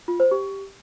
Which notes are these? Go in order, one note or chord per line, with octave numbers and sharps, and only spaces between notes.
F4
C5
G4